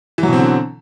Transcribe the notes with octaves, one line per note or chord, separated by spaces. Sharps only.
B2 D3 E3 F#3 C4